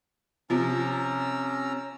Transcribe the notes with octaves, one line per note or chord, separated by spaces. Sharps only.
C3 F3 C#4 A#5 E6